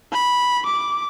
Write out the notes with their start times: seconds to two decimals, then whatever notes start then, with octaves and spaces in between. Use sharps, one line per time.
0.13 B5
0.67 D6